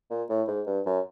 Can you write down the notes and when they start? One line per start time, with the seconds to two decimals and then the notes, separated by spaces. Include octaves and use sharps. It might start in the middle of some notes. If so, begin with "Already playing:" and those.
0.10 A#2
0.29 A2
0.48 G#2
0.67 G2
0.86 F#2